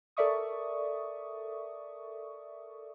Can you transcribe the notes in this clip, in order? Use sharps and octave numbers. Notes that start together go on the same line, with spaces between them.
A4 A#4 D5 E5 C#6 D#6